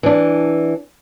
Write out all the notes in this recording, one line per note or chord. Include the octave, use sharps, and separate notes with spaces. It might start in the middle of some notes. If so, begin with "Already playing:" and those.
E3 D4